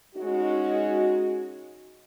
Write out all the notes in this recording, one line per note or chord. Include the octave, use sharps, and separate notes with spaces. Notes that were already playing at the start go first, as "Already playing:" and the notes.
G#3 C#4 D#4 F#4